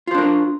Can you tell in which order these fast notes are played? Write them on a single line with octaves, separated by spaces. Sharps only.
F4 C5 D4 A#4